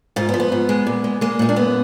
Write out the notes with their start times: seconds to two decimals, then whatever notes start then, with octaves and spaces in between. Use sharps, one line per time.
0.16 G#2 F4
0.29 B3
0.34 F3
0.40 B3
0.52 G#2
0.69 G#3
0.87 A#2
1.04 G#3
1.21 G#3 A#3
1.39 A#2 D#4
1.49 D4
1.56 F#2 B3